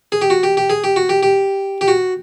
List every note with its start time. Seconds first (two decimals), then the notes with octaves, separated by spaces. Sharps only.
0.12 G#4
0.22 G4
0.30 F#4
0.43 G4
0.57 G4
0.70 G#4
0.84 G4
0.96 F#4
1.09 G4
1.23 G4
1.81 G4
1.88 F#4